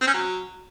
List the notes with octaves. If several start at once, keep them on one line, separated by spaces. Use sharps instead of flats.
C4
C#4
F#3